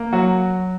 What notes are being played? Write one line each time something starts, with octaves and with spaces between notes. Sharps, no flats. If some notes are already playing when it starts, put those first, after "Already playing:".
Already playing: A#3
F#3 F#4